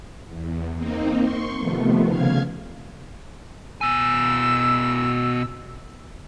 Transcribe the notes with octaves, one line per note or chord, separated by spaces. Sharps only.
E2
A#3 C4 D#4
C6 C#6
C3 D#3 F3 A3 B3
C#3 F5 F6 G#6
B2 G#5 E6